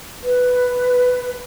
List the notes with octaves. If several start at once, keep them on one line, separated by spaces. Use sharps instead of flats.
B4